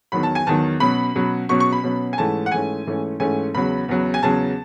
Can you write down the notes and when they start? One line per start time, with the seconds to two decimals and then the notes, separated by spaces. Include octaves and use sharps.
0.12 E2 D#3 F#3 B5
0.23 A5
0.35 G#5
0.47 E2 D#3 F#3 A5
0.80 B2 F#3 C#4 B5
1.15 B2 F#3 C#4
1.49 B2 F#3 C#4 C#6
1.60 C#6
1.73 B5
1.83 B2 F#3 C#4
2.13 G#5
2.18 G#2 E3 A3 C#4 A5
2.46 F#5
2.52 G#2 E3 A3 C#4 G#5
2.87 G#2 E3 A3 C#4
3.20 G#2 E3 A3 C#4 G#5
3.54 E2 C#3 F#3 B5
3.89 E2 C#3 F#3
4.14 G#5
4.23 E2 C#3 F#3 A5